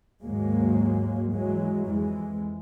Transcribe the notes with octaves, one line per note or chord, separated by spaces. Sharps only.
D#2 G#2 F#3 G#3 A#3
E3 F#3 G#3
F2 E3 G#3